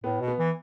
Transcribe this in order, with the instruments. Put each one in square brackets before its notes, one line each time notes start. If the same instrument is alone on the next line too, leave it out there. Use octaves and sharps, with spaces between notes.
[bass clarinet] A2 [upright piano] B3
[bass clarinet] B2
[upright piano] B3
[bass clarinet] E3